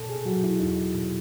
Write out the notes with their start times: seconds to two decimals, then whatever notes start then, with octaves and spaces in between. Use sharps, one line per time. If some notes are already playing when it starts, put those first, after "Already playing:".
Already playing: B2 A4
0.09 G#4
0.25 F#3 F#4
0.44 E4
0.60 E2 D#4
0.94 B2